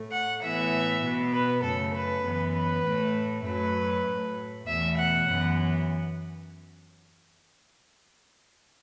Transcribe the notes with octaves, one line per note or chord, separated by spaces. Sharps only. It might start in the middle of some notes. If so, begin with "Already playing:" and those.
Already playing: A2 A3
F#5
A2 E3 B3 E5
B2 B3
B4
F#2 C#3 A3 A4
B4
F#2 E3 B3
B4
A2 A3
F#2 F#3 A3 B4
A2 A3
E2 B2 A3 E5
F#5
F#2 E3 B3